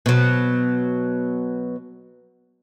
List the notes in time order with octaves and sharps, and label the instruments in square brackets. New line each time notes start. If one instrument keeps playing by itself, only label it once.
[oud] B2 F#3